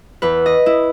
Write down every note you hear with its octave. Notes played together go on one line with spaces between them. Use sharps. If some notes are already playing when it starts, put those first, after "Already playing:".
E2 B4
D#5
E4